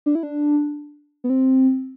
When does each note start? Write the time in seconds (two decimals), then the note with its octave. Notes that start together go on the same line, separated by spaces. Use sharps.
0.06 D4
0.15 E4
0.23 D4
1.24 B3
1.30 C4